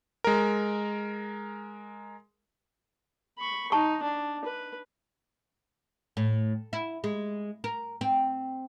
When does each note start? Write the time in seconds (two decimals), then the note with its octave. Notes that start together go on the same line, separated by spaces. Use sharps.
0.24 G#3 A#4
3.39 B5 C#6
3.72 D#4 A5 C#6
4.03 D4
4.45 B4
6.17 A2
6.73 E4
7.04 G#3
7.64 A#4
8.01 C4